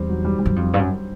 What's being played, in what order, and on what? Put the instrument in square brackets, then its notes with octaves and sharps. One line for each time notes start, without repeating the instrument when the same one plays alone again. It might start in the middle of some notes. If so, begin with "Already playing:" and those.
Already playing: [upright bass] E2 [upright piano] G3 C4
[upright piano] F#3
G3
G3
[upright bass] F#2
F2
G2
F#2